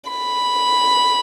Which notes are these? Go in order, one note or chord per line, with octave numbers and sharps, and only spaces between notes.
B5